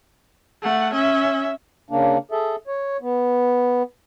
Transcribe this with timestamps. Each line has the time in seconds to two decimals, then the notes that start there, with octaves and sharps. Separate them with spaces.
0.62 A3 F#5
0.94 C#4 E5
1.90 C#3 A#3 D4
2.31 G#4 A4 E5
2.67 C#5
3.01 B3